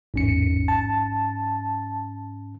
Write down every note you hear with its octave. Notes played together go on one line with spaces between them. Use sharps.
A1 E2 G#2 C#4 C#7
A5